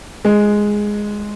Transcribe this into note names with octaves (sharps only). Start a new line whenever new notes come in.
G#3